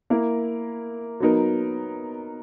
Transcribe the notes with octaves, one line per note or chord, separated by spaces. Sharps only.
A#3 E4 A#4
F#3 B3 D#4 A#4